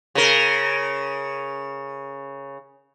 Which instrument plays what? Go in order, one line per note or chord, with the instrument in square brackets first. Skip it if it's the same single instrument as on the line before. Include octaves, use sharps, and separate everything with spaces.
[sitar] C#3 A#4